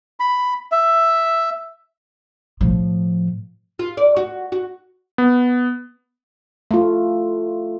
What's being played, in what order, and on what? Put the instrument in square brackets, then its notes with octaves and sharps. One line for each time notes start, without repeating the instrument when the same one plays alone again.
[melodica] B5
E5
[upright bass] A2 F3
[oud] F4
D5
F#4
F#4
[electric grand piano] B3
[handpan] A3 F4